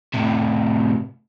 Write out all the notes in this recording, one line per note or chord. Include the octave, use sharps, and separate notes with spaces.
A2 C3